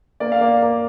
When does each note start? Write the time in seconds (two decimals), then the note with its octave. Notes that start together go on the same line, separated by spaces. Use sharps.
0.20 A#3 D5
0.32 F5
0.41 A#3 D5
0.62 A#3